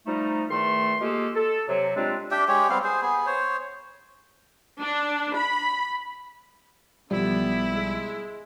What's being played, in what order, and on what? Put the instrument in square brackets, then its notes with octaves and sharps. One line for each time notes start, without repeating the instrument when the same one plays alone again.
[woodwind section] F3 G3 A3 D#4
E2 D#3 A3 C6
G#3 A#3 F4 G4 A4
A4
C3 F#3
G3 G#3 C4 D4 F4
[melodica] D4 G4 E5 G5
G#3 G4 C#5
G3 B3 C4 F5
G#4 C5
B3 G#4
C5 C#5
[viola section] D4
B5
[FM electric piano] B1 F3 [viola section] D3 B3 G4 [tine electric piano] G3 [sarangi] E4
[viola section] G#3